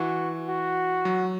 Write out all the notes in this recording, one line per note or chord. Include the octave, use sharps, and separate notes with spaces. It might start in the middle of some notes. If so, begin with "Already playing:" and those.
Already playing: E3 F#4
F#4
F#3